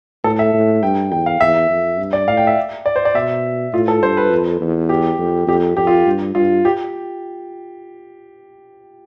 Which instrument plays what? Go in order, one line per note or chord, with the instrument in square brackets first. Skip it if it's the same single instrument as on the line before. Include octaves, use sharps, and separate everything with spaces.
[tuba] A2 [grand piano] A4
[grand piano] E5
[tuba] A2
[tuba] G2 [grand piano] G5
[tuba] E2 [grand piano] G5
[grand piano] F5
[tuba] E2 [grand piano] E5
[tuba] F2
G2
[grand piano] D5
[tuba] A2 [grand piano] F5
[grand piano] G5
E5
D5
C5
D5
[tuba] B2 [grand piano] E5
[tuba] A2 [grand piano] F4
[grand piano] A4
[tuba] G2 [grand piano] C5
[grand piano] B4
[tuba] F2
E2
[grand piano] G4
[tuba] F2
[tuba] F2 [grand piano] G4
[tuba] F2 [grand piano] G4
[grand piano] F4
[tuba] G2
[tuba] G2 [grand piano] F4
[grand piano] G4